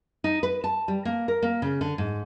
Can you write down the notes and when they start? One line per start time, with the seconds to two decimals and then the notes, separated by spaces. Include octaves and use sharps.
0.24 D#4
0.43 B4
0.64 A5
0.88 G3
1.05 A#3
1.28 A#4
1.42 A#3
1.62 C#3
1.81 D3
1.98 G#2